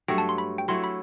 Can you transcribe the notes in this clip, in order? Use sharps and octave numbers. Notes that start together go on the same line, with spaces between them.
G2 F#3 A3 G5
A5
C6
B5
G5
F#3 A3 E4 C6
B5